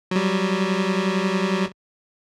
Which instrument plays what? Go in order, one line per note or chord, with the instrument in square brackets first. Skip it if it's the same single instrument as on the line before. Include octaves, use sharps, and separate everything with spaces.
[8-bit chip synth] F#3 G3